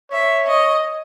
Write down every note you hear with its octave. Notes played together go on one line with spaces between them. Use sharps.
C#5 E5
D#5